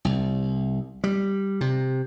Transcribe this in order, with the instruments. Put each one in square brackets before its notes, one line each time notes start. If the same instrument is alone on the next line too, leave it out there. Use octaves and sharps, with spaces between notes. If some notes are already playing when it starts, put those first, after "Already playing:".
[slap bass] C2
G3
C3